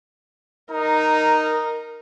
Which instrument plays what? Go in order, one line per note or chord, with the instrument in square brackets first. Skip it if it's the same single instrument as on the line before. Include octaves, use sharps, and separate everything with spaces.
[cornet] D#4 [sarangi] A#4